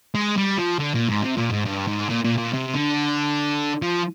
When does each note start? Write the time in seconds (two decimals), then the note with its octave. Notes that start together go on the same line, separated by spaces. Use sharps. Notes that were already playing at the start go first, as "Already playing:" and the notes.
0.15 G#3
0.37 G3
0.58 F3
0.79 D3
0.94 A#2
1.08 G#2
1.23 C3
1.37 A#2
1.51 G#2
1.66 G2
1.88 G#2
2.09 A#2
2.24 A#2
2.38 A#2
2.53 C3
2.74 D3
3.82 F3